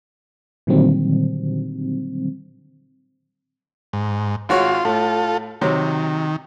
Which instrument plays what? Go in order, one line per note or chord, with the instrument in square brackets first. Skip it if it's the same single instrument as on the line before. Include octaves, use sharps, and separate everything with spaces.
[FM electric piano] A#2 D3 D#3 F#3 G3 C4
[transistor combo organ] G#2
[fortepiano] G#1 F#4 C#5 [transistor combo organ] F4 C6
[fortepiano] A2 [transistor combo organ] F4 A4
[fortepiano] C3 F#3 [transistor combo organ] D#3